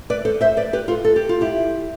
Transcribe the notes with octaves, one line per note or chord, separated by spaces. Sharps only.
B4 D5
A4 C5
C5 E5
B4 D5
G4 B4
F4 A4
A4
G4
F4
E4 G4